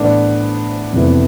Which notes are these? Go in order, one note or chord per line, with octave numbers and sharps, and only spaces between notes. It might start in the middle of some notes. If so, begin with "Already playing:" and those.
Already playing: A2 E3 A3 B3 D4
F2 C3 E3 B3 E4